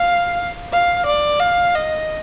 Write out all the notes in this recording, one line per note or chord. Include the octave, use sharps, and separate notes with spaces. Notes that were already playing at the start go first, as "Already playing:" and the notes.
Already playing: F5
F5
D5
F5
D#5